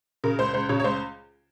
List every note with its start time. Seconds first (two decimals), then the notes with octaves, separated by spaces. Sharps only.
0.24 C#3 A#4
0.39 C#2 C5
0.54 C#2 C5
0.69 C#3 C#5
0.80 C#5
0.84 C#2 C5